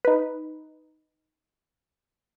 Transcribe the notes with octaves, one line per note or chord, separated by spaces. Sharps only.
D#4 B4